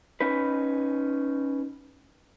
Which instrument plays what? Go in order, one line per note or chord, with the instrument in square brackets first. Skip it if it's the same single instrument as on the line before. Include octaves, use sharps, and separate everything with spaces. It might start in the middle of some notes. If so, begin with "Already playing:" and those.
[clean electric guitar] C#4 D#4 B4